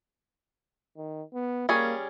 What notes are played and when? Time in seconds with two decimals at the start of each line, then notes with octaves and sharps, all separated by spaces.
0.97 D#3
1.33 B3
1.69 G3 A#3 C#4 G#4